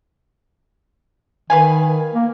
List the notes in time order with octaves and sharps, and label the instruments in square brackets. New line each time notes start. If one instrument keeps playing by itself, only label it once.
[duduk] D#3 [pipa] B4 F5 G#5
[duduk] A#3